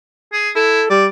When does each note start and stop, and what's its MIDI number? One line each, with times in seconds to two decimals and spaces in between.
0.33 0.50 68
0.56 0.82 64
0.56 0.89 69
0.90 1.08 55
0.90 1.05 74